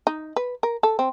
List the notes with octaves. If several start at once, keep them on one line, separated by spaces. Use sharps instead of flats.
D#4
B4
A#4
A4
C4